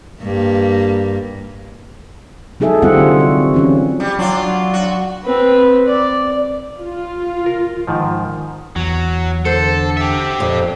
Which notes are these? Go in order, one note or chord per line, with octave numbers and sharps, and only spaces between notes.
G2 A#3
F#3 D#4 G#4 A4 E5
D3 G3 C4 F4 F#5
F#4
E3 C#4 F4
G3
F#3 D4 F4
F#4
C4 B4
D5
F4
A#4
G#2 D#3 F3
E2 F#3
D3 A4 C5
G4 E5
F2 A#2